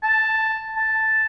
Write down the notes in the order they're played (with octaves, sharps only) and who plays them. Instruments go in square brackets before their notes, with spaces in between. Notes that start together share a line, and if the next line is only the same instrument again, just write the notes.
[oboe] A5
A5